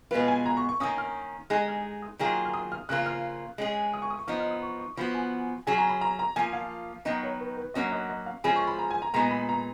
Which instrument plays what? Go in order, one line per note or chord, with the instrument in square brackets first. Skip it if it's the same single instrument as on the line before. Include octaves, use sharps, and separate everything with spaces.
[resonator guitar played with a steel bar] B2 G#3 B3 F4 [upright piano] B4
[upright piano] G#5
A#5
C#6
C#6
[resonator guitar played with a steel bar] D#3 A#3 C#4 [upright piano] D#6
[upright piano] F6
[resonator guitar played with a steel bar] G#3 D#4 G#4 [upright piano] F#6
[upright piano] F6
D#6
[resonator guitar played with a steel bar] D#3 F#3 A#3 F4 G#4
[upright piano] F6
D#6
F6
[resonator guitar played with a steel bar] C#3 F3 A#3 F4 [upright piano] F#6
[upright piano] F6
[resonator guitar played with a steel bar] G#3 C#4 G#4
[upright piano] D#6
C#6
D#6
C#6
[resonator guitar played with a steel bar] F3 B3 D#4 [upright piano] F6
[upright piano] F6
D#6
C#6
C#6
[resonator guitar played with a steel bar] F3 B3 F#4 [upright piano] B5
[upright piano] G#5
[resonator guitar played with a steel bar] F#3 C#4 G#4 [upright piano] G#5
[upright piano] A#5
B5
A#5
A#5
[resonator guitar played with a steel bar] F3 A#3 F4 [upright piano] G#5
[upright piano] F5
[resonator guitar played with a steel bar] D#3 F#3 B3 D#4 [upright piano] D#5
[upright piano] C#5
B4
B4
[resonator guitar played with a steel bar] F#3 A#3 C#4 F#4 [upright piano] D#5
[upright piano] D#5
D#5
F5
[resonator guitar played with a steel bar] F3 G#3 C#4 G#4 [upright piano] B5
[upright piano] C#6
B5
A#5
G#5
A#5
[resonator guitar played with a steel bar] A#2 G#3 B3 D#4 [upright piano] A#5
[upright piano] B5
A#5